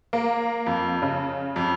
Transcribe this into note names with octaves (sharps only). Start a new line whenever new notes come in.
A#3
F2
C#3
F2